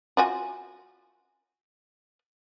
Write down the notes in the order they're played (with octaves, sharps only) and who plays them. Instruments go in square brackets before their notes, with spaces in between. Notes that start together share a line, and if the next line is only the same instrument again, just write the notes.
[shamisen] F4 F#4 G#5